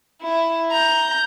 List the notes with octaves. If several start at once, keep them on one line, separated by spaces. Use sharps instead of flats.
E4
A#5 G6